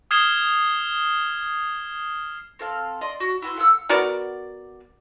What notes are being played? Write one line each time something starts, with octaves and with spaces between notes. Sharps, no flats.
D#6 F6 G#6 C7 E7 G7
C4 A4 F5
D5 D#5 C6
F#4
E4 F#4 B4 C6
A4 F5 F#5 E6
B3 F#4 A#4 D5